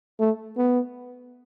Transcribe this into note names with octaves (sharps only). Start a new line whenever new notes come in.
A3
B3